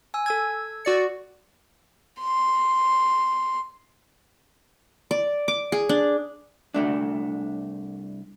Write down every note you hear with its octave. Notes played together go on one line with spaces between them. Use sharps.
G#5 E6
A4 E6 G#6
F#4 D5 C#7
C6
D5
D6
G#4
D4
C2 A3 D4